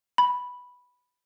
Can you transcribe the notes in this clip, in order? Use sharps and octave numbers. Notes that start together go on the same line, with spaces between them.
B5